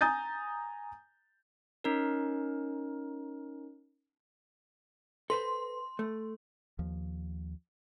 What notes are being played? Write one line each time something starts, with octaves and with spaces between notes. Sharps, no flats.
G#5 A#5 D#6 G6 A6
C#4 D#4 A#4
A4 B4 C5 C6
A3
D#2 F3